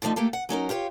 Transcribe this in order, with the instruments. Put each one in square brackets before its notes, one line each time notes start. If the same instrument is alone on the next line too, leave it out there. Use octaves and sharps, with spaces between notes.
[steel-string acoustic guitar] D3 D#3 F3 A3 D#4
A3 A#3 G4 A4
F#5
F#3 C#4 D#4 A#4
F4 G4 B4 C#5